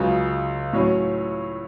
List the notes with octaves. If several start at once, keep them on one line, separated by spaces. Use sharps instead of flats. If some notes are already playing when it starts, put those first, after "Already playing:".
Already playing: C#2 C#3 F#3
A2 F#3 C#4